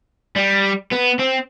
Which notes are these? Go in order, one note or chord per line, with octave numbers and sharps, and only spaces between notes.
G3
B3
C4